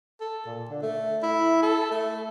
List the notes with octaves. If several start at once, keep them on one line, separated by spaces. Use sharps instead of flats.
A4
A#2
D3
A3
E4
A4
A3